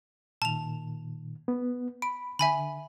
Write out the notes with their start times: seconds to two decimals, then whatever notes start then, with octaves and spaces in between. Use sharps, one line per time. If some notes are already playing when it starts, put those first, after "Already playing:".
0.42 A#2 D#3 A5 F7
1.48 B3
2.02 B5 D7
2.39 D3 E5 G#5 B5